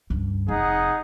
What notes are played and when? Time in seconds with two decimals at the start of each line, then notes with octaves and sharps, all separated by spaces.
0.10 C#2 G2
0.48 F1 D#4 G#4 F#5